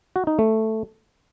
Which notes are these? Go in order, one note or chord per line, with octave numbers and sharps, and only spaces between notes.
F#4
D#4
A3